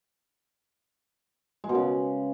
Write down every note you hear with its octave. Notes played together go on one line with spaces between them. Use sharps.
G#3
B2
C#3